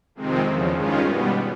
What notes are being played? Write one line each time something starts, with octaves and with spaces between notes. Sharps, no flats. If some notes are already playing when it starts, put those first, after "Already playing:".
F2 C3 D#3 G#3 C4
E2 C#3 F3
G2 D#3 G#3 C#4 F4
B2 G3 B3